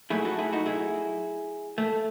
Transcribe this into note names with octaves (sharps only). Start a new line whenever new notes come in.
A2 F#3 A3 E4 G#4
F#4 A4
E4 G#4
D#4 F#4
E4 G#4
A3